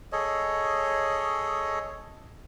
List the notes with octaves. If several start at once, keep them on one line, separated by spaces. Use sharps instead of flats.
G#4 A4 C#5 D#5